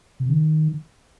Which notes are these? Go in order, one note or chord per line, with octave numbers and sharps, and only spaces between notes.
C3
D#3